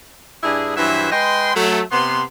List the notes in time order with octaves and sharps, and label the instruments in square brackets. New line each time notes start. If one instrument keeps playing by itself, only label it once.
[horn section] G2 D4 E4 G#4
G2 E3 F#3 E4 C5 E5
G#3 B4 D#5 G5 C6
F#3 A3
C3 B3 C6